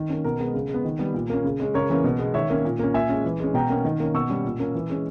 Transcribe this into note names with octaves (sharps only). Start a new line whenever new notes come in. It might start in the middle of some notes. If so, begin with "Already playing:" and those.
Already playing: D#3
A#3 C#4
B2 A#4
G#3 B3
C#3
G#3 B3
D#3
G3 B3
A#2
A#3 C#4
C#3
G#3 C#4
C#3 A#4 C#5
E3 A#3 C#4
B2
G#3 B3
D#3 C#5 E5
A#3 C#4
A#2
A#3 C#4
A#2 E5 G#5
G#3 C#4
E3
G#3 C#4
B2 G5 A#5
A#3 C#4
D#3
A#3 C#4
B2 C#6 E6
G3 C#4
A#2
A#3 C#4
E3
G#3 C#4